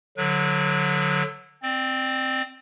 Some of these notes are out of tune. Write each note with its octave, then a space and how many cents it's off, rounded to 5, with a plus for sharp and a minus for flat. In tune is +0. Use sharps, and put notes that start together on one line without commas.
D3 -5 F#3 -25 B4 -40
C4 +0 D5 +30